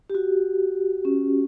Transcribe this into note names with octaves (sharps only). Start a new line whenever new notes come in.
G4
F#4
C#4